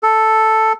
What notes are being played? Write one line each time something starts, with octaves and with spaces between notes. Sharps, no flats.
A4